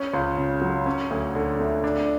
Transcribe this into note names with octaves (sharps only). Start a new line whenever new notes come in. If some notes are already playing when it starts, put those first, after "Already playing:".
Already playing: C#4
C#2
C#3
F#3
C#4
D2
D3
A3
D4